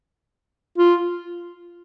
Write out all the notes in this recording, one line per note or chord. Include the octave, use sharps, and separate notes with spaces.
F4